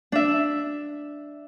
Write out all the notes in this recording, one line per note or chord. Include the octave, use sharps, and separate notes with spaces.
D4 E5